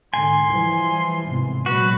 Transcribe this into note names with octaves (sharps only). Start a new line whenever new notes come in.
G#2 D3 G#5 C6
E3 F3 G3
G#1 C3 B3
A#2 F#3 G#3 F#4 B4